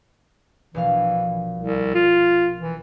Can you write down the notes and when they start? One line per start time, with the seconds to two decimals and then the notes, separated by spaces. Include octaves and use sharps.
0.74 A#1 B2 E3 F5
1.59 C2
1.95 F4
2.61 E3